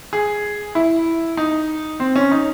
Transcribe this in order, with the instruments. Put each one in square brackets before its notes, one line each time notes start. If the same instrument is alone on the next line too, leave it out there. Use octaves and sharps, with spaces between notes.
[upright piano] G#4
E4
D#4
C4
C#4
D#4